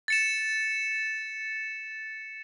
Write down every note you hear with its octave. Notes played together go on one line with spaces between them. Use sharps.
A6 C#7 E7